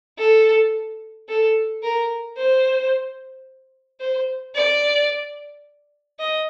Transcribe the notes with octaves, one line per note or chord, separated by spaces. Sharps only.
A4
A4
A#4
C5
C5
D5
D#5